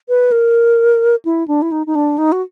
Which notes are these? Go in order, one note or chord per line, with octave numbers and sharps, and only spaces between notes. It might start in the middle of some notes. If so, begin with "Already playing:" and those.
B4
A#4
E4
D4
E4
D#4
D#4
D4
D#4
F#4